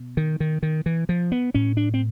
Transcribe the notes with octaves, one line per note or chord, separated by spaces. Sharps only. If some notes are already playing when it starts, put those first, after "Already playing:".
Already playing: B2
D#3
D#3
D#3
E3
F3
B3
A2 C#4
D4
C4